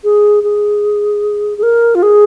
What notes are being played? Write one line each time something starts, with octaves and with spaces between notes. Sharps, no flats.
G#4
G#4
G#4
A#4
F4
G#4